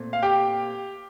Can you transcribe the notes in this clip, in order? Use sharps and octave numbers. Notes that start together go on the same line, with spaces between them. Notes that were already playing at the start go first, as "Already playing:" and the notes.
Already playing: A#2 A3 C4
F5
G4 G5